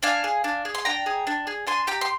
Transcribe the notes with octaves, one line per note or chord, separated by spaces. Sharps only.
D4 F5 G#5
G#4
D4
G#4
C6
D4 G5 A#5
G#4
D4
G#4
D4 G#5 C6
G4 G5 A#5
C6